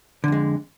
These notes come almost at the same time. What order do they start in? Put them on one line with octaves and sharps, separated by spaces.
D3 F2 G#3